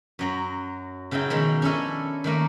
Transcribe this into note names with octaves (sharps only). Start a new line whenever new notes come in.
F#2 F#3 A#5
C#3 F#3 D#4 E4 G5
B2 D#3 F3 G#3
C#4 D4 E4 A4 D#5
D#3 A3 A#3 A#4